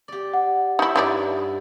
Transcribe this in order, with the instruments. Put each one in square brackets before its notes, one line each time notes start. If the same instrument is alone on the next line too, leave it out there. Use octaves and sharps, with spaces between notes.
[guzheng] G4 D5
[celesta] F#5
[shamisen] D#4 E4 [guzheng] C#5 E5
[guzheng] G2 B4 A5 [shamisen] D#4 E4 D5